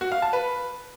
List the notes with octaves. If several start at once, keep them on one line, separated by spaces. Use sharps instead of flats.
F#4
F5
A5
B4